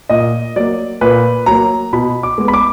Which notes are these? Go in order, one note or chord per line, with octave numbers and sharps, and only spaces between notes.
A#2 D#5
F#3 A#3 D5
A#2 B4
F#3 A#3 A#5
B2 B5
D6
G#3 B3
B5
D6